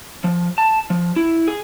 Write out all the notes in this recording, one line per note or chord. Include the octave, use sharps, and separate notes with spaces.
F3
A5
F3
E4
G#4